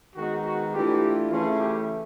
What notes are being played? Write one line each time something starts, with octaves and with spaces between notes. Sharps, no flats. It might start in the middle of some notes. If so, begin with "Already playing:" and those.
D#3 G#3 B3 D#4 F#4
F#4
E3 A3 D4 F4 G4
C#3 E3 A3 C#4 E4 F4
G4